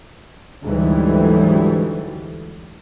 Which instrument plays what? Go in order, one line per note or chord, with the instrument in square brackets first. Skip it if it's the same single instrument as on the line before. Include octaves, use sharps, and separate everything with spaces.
[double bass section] D2 G#2 E3 F#3 G3